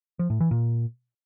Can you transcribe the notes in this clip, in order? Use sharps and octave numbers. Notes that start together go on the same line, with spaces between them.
F3
A2
E3
A#2